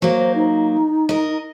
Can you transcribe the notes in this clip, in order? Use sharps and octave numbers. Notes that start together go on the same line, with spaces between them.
F#3 A#3 C5
D#4
A#4 D#5